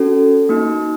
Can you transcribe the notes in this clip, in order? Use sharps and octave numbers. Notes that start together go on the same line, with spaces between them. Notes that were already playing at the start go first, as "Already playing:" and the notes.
Already playing: C#4 F#4 A4
A#3 D#4 F#4